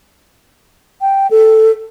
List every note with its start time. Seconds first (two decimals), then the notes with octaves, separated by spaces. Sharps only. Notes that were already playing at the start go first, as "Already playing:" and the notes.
1.01 G5
1.31 A4